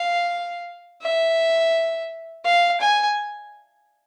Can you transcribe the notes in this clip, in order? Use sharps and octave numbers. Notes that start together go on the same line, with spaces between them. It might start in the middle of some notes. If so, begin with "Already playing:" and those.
Already playing: F5
E5
F5
G#5